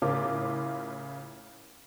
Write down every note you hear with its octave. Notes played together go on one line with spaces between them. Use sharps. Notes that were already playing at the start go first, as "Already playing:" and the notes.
A2 C#3 E4 F4 A#4 D6